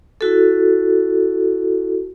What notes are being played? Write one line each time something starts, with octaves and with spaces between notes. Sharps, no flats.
E4 F#4 A4